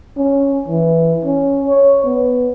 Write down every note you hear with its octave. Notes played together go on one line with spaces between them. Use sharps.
C#4
E3
C#4
C#5
B3